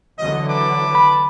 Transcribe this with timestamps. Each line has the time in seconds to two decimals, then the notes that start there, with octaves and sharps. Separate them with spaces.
0.18 D3 E3 F#3 D#5
0.49 B4 A5 D6
0.95 B5